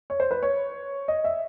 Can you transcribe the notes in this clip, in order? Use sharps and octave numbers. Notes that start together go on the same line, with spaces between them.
C#5
C5
B4
C#5
D#5
E5